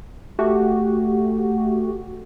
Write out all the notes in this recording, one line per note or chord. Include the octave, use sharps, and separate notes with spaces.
A3 F#4 G4